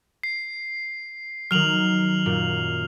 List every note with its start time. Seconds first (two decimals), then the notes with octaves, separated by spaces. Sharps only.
0.23 C7
1.51 D#3 F#3 F6 F7 F#7
2.26 F#2 A#2